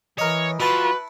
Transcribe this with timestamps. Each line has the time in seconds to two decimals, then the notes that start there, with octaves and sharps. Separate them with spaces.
0.18 E3 A#4 C#5 D#5
0.60 F3 E4 F#4 B4 A5 C#6